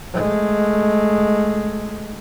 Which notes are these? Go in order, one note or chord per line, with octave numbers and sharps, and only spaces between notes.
G#3 A3